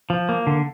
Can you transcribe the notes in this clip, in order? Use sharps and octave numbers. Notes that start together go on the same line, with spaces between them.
F3
A#3
D3